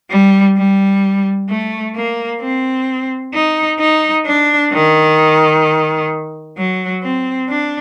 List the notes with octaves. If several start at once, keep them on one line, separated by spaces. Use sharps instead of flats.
G3
G3
A3
A#3
C4
D#4
D#4
D4
D#3
F#3
C4
D4